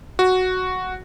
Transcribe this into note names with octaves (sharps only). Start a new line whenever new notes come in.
F#4